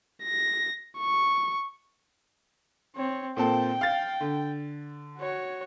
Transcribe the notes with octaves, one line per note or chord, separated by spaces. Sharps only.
A#6
C#6
C4 C#5
A#2 C4 A4 G5
F5 A6
D3
F#4 C#5